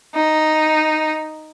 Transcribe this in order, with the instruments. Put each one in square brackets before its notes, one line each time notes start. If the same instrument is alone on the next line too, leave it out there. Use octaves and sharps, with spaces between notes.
[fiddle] D#4